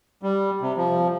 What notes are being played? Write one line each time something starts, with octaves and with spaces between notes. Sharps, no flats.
G3
C3
F3